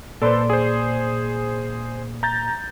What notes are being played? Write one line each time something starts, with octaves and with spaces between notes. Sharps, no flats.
A#2 A4 B4 C5 D5 C6
G#4 C5
A#5 G6 A6